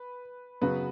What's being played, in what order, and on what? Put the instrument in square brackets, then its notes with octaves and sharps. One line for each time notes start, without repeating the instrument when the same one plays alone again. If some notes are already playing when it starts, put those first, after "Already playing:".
Already playing: [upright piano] B4
[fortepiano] C#3 F#3 B3 [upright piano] F#4 B4